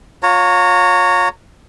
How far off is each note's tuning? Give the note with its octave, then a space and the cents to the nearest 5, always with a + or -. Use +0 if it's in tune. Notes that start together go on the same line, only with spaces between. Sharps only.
F4 +30 C#5 +0 A#5 -30